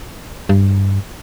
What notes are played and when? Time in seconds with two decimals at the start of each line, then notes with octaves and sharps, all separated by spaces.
0.49 G2